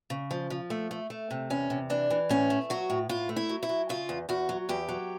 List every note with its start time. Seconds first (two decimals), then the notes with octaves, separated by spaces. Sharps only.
0.10 C#3
0.31 F3
0.50 F3
0.70 A3
0.91 A3
1.10 A3
1.31 C3
1.50 E2 C#4
1.70 C3
1.90 E3 D4
2.10 E3
2.29 A2 C#4
2.50 A3
2.70 F#3 F#4
2.90 A2
3.09 A2 F4
3.29 A3
3.36 E4
3.49 F#3
3.63 E4
3.69 F#3
3.89 C#3 F4
4.09 E2
4.29 E2 F#4
4.49 F#3
4.69 E2 G4
4.89 F#3